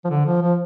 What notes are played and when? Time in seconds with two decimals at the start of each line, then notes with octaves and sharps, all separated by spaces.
0.04 F3
0.10 D3
0.26 F3
0.42 F3